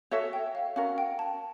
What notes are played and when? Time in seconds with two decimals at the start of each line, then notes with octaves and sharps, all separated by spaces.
0.11 F#4 A4 C#5 E5 G#5
0.33 G5
0.55 F5
0.76 C#4 F#4 A#4 F5
0.98 G5
1.19 A5